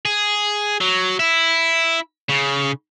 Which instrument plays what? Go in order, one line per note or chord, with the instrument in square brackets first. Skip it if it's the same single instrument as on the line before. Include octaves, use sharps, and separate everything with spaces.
[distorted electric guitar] G#4
F#3
E4
C#3